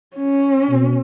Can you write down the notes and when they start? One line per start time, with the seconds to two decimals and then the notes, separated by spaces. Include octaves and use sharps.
0.17 C#4
0.70 B2